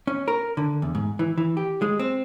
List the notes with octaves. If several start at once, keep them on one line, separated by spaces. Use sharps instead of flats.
C#4
A#4
D3
E2
G#2
E3
E3
G4
G#3
C4